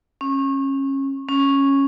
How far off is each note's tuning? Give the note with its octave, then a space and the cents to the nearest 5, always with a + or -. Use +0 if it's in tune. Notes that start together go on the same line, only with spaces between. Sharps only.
C#4 -25
C#4 -10